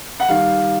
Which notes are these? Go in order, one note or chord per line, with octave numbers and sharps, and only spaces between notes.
F#5
D#3 G3 F5